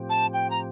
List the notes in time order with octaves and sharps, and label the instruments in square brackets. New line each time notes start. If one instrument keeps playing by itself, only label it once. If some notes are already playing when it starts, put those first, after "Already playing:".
Already playing: [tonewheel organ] A2 F3 C4 G4
[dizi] A5
G5
A#5